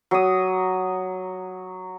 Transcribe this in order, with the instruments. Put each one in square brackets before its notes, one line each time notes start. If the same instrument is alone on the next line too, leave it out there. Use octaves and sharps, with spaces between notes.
[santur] F#3 D#6